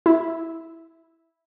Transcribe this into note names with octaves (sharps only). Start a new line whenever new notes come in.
E4